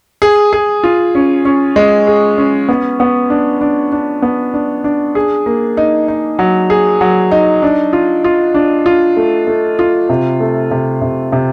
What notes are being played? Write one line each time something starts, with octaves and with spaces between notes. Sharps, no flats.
G#4
G#4
F4
C#4
C#4
G#3
G#4
C#4
B3
B3
D4
D4
D4
B3
D4
D4
G#4
A#3
D#4
D#4
F#3
G#4
F#3
D#4
D4
F4
F4
D4
F4
A3
A3
F4
C3
A3
C3
C3
C3